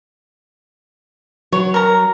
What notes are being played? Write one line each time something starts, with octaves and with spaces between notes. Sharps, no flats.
F#3 C#5
A#4 A#5